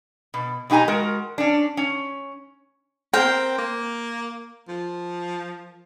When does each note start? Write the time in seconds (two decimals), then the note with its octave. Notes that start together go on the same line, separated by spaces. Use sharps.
0.34 B2
0.70 B2 D#4 G4 G#5 A#5
0.88 G#3 F#4 A#4
1.38 C#4 D4
1.77 C#4
3.13 C4 A#4 G5
3.58 A#3
4.68 F3